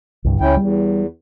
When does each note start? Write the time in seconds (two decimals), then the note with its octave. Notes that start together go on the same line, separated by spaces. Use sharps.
0.24 C2 G2 D3
0.40 C#2 C#4 E4 G5
0.57 E2 G3